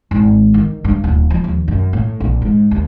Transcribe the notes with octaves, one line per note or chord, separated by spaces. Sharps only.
G#1
D#3
G2
D1
F3
D#2
F#2
A2
A#1
G#2
D#2